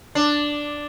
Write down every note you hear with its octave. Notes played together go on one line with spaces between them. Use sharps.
D4